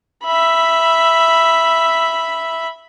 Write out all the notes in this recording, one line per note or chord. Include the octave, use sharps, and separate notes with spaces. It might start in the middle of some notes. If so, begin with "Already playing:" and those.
E5 B5